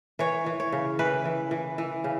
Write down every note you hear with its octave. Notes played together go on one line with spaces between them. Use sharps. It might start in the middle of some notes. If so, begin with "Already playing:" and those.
E3 C#5
E3
C#5
C#3
E3 B4
E3
E3
E3
C#3